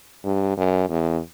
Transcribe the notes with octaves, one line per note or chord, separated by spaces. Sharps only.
G2
F#2
E2